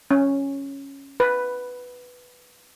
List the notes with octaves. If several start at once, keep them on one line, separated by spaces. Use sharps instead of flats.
C#4
B4